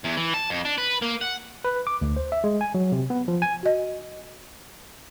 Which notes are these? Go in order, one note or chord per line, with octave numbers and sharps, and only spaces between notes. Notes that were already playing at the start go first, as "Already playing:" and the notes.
E2
E3
A5
F2
D4
B4
A#3
F#5
B4
D6
D2
C5
E5
G#3
G#5
F#3
C3
B3
F3
G#5
F#4 D#5